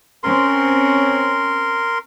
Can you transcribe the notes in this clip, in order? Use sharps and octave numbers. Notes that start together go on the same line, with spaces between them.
C4 C#4 A#4 C6